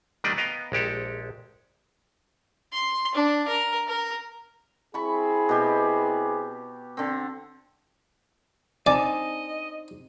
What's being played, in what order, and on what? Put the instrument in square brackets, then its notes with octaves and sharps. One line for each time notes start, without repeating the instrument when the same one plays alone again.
[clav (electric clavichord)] D#3 G3 A3 D4 D5 D#5
B3 D#5 F5 G5 A#5
A#1 G#3 G4 A4
[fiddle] C6
D4
A#4
A#4
[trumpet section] C4 E4 G#4 [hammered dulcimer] B5 C#6
[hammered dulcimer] B2 G4
D3 C4
[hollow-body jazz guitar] C4 D4 D#4 [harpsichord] D5 [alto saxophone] D#5 [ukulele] G#5 A5